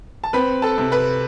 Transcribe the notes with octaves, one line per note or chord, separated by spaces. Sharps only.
A5
C4 B4 B5
A4 A5
C3
B4 B5